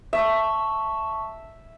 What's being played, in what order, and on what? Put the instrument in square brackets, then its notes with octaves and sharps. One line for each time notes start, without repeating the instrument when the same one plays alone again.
[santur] E5 [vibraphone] A5 C#6